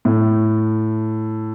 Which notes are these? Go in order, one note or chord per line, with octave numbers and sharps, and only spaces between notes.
A2